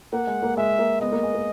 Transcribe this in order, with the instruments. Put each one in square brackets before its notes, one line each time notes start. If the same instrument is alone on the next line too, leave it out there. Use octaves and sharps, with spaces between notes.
[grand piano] A#3 [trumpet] F#5
[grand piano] G#3
A#3
[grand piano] G#3 [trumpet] E5
[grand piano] A#3
[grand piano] G#3 B3 [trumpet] D#5
[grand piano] A#3
G#3
A#3